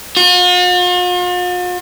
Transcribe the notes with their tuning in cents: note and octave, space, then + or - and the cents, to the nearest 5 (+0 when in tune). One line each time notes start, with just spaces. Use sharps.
F4 +45